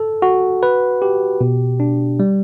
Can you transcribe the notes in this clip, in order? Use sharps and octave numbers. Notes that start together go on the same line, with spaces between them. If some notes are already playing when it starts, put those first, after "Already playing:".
Already playing: A4
F#4
B4
G4
B2
D4
G3